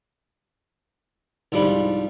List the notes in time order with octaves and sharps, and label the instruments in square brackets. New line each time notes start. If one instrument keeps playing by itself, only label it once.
[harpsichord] C2 G#2 F3 G3 D4 B5